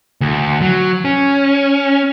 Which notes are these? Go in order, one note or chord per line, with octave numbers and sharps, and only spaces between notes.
D2
F#3
C#4